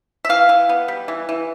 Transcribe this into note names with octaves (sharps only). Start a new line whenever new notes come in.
E5
E3 F5
E3
B3
G3
E3
E3